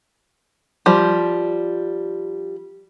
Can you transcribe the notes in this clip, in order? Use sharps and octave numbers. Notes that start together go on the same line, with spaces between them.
F3 G3